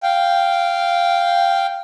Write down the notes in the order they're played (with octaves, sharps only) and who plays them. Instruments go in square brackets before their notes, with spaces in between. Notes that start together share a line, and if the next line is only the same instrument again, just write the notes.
[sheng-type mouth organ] F5 G5